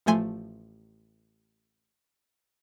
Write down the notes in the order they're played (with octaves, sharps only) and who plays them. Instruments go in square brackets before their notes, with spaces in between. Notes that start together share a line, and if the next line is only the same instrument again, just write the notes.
[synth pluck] A1 F3 A3 G#5 C6